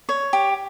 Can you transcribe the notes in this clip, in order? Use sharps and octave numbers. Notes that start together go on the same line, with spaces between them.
C#5
G4